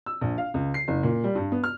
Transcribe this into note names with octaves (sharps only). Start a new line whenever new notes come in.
E6
A#1
F5
C#2
C7
F#1
A#2
G3
G2
B3
F6